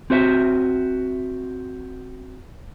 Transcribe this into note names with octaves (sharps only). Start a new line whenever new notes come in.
C4 F#4 C5 E5